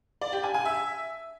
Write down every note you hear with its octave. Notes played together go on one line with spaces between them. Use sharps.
D5
G4
G#5
G#5
E5